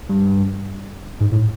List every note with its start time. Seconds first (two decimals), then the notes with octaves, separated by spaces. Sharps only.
0.09 G2
1.21 G#2
1.32 A2